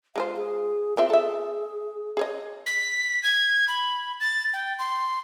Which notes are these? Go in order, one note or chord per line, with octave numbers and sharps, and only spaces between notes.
G#3 F4 C5 F5
G#4
B3 C4 F4 E5
G#4 A4 E5
G#4 C#5 D#5
B6
G#6
B5
A6
G5
C6